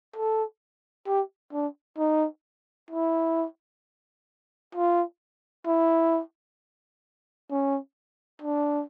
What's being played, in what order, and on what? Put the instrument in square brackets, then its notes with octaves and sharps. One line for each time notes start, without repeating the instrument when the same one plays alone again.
[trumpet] A4
G4
D4
D#4
E4
F4
E4
C#4
D4